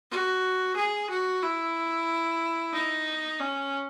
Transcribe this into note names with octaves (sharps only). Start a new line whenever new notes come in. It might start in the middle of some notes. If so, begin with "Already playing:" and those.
F#4
G#4
F#4
E4
D#4
C#4